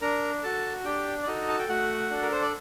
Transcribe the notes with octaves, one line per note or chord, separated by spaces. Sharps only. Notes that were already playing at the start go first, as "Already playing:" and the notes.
D4 A#4 A#5
F#4 A4 A5
D4 G4 G5
D5
D#4 F#4 A4 D#5
A5
G5
A3 F#4 F#5
D4 A4
A#4
C5
D5